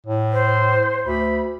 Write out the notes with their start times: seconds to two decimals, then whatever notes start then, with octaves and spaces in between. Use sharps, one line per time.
0.07 A2
0.33 C5
1.06 D2 B5